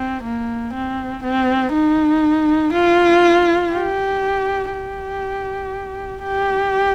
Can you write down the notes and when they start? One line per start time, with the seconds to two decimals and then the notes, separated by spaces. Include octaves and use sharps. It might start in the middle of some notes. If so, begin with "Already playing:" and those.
Already playing: C4
0.23 A#3
0.73 C4
1.23 C4
1.73 D#4
2.73 F4
3.73 G4
4.73 G4
6.23 G4